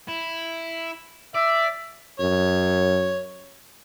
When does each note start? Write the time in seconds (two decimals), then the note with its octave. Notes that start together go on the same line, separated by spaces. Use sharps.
0.08 E4
1.35 D5 E5
2.20 F#2 C#5